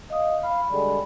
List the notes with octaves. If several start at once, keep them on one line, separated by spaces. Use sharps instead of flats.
D#5 F5 D#6
F5 B5
D3 G3 G#3